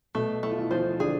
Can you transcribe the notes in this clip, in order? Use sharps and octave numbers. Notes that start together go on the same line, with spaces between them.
B2 A3 B3
A3 E4
F4
E3 E4
F3 F4 C5
D3 D4 G#4